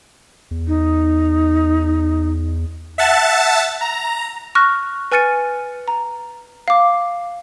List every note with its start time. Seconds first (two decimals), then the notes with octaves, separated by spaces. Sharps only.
0.51 E2
0.67 D#4
2.98 E5 F#5 A5 A6
3.81 A#5
4.55 C#6 F6 F#6 A#6
5.12 B4 G#5 F6 A6 C#7 D#7
5.88 A#5
6.68 F5 D6